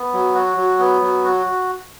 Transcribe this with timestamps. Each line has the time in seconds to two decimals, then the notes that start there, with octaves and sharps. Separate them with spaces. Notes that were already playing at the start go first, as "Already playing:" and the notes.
Already playing: B3
0.13 F#3
0.35 F#4
0.57 F#3
0.79 B3
1.02 F#3
1.24 F#4